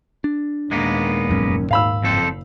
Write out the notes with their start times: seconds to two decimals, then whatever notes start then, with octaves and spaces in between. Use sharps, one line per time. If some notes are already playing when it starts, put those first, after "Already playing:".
0.24 D4
0.71 D#2 A#2 G#3 A#3 B3
1.29 F1 F#2 C#4
1.71 G#2 F5 B5 E6
2.03 F#1 F2 A4 C5